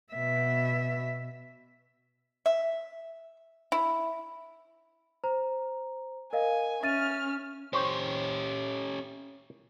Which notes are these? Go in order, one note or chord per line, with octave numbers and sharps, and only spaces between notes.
B2 E5
E5
E4
C5 A#5
A#4 D#5 F5 G#5
C#4 E5 F6 A6 D#7
C#4 G4 C5 C#5